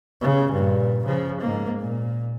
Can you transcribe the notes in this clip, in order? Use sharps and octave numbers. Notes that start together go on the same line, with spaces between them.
C#3
G2 A#2
C#3 F3
G#2 A#3
A#2